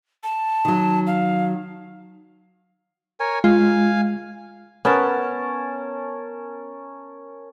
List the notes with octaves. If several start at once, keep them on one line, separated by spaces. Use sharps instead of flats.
A5
D#3 F#3
F5
A#4 C#5 G#5
G#3 F4 F5 G#5
B3 C#4 A#4 A5